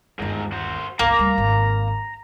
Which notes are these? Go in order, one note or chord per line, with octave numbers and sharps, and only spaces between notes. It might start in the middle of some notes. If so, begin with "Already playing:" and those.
G1 D#2 G#2 A#4
F#4 C5
G1 C#2 A#3 A#5
D2 G3
G#1